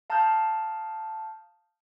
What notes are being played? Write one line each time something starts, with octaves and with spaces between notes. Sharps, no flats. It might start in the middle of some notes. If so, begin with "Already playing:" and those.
F5 A5 A#5 D#6 F6 G6